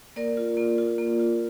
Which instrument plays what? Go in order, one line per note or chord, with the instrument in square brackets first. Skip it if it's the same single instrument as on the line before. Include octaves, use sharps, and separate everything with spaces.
[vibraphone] A#3 A#4 D5
F4
A#3
F4
A#3
F4